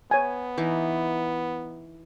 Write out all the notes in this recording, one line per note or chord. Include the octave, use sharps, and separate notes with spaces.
B3 C#5 G#5
E3 D#4